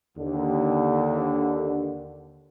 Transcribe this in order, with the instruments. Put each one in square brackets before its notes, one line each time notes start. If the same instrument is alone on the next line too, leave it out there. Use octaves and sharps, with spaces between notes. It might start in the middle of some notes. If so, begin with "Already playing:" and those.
[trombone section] D#2 D3